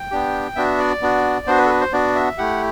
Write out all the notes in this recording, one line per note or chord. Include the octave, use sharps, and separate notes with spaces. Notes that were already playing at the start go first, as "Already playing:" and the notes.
Already playing: G5
B3 D4 G4
B3 D4 F#4 E5
D5
B3 D4 F#4
B3 D4 F#4 C5
B4
A4
B4
C5
B3 D4 F#4 D5
E5
A3 E4 G4 F#5